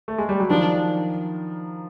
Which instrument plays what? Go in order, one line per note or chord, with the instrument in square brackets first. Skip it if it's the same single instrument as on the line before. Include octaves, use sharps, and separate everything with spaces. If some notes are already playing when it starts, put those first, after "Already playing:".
[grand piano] A3
G#3
G3
F#3
[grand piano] D#3 F3 [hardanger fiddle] D4